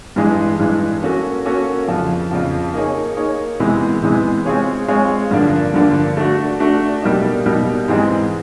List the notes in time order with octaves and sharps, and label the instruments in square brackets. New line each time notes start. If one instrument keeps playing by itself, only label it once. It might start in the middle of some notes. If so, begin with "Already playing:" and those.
[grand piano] G2 E3 G#3
G2 E3 G#3
A#3 C#4 F#4 A4
A#3 C#4 F#4 A4
F2 C#3 F3
F2 C#3 F3
A#3 D#4 G#4 C#5
A#3 D#4 G#4 C#5
C3 E3 G#3 B3
C3 E3 G#3 B3
G#3 C4 F4 G#4 C#5
G#3 C4 F4 G#4 C#5
G2 D3 F3 A#3 D4
G2 D3 F3 A#3 D4
A3 D4 F#4
A3 D4 F#4
B2 G3 A#3 D#4
B2 G3 A#3 D#4
G#2 E3 G#3 C4